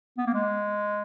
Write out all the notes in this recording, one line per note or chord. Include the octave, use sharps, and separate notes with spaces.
B3
A#3
G#3